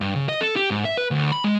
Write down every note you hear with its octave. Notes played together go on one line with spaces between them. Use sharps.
G2
C#3
D#5
A4
G4
G#2
E5
B4
D2
B5
G#3